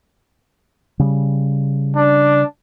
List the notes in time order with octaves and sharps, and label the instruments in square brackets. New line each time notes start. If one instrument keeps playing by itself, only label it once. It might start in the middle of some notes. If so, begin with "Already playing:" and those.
[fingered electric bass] C#3 G3
[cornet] D4